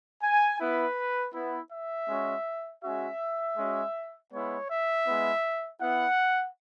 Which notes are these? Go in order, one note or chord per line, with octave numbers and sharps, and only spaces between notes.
G#5
B3 E4 B4
B3 E4
E5
G#3 C#4 F#4
G#3 C#4 F#4 E5
G#3 C#4 F#4
G#3 B3 E4 C#5
E5
G#3 B3 E4
B3 E4 F#5